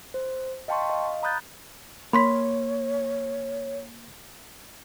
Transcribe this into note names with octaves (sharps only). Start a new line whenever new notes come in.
C5
D#5 F5 G5 A5 C6 C#6
D#5 F5
A#5 B5 D#6 F#6 G6 A6
A#3 C#5 B5 C6 B6